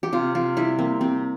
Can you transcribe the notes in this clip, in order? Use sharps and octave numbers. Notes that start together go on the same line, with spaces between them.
G4
C3 F4
C3 F4
G3 E4
A#3 C4
C3 C4